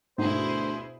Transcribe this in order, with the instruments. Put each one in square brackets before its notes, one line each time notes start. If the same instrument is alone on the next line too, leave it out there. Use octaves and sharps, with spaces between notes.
[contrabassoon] D2 [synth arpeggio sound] G#2 B3 D#4 [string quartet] B2 E4 G#4 [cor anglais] C5